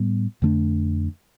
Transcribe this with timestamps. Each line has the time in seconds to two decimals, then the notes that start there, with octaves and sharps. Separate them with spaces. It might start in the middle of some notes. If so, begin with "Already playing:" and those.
Already playing: A2 G3 B3
0.42 F2 D3 A3 D4